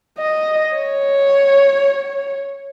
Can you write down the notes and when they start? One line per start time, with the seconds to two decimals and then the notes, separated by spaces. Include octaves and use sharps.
0.18 D#5
0.76 C#5